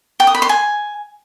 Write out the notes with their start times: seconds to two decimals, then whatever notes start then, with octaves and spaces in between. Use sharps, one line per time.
0.20 G5
0.27 D#6
0.35 B5
0.42 C6
0.49 G#5